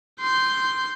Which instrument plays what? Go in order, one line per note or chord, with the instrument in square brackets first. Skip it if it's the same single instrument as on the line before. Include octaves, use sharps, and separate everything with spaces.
[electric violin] C6 G6